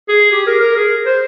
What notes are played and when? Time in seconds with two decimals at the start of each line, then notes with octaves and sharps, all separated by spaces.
0.09 G#4
0.32 G4
0.47 A#4
0.61 A#4
0.77 G#4
1.06 C5